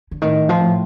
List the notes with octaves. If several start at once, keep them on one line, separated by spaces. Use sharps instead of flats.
D3
A2 D#3
F3
A2